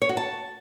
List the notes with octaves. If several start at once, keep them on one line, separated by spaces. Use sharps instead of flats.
C#5
F#4
A5